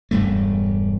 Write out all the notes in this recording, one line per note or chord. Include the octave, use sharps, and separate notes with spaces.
E1 G2 A3